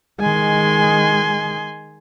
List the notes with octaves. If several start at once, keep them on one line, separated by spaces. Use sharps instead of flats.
D#3 G#3 G#5 C6